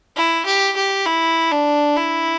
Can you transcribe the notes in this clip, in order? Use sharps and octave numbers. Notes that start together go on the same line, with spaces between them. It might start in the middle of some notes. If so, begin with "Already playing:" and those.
E4
G4
G4
E4
D4
E4